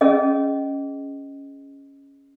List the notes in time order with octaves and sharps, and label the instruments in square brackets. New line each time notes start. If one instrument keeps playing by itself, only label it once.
[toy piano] C#4 G#4 D#5